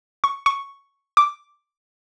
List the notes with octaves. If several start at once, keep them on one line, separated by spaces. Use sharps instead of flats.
C#6
C#6
D6